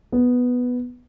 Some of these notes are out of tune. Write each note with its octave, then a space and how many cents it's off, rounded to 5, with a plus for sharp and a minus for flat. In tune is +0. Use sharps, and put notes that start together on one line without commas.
B3 +0